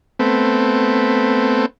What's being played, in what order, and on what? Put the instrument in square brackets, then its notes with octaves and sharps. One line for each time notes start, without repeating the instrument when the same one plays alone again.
[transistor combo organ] A3 B3 C4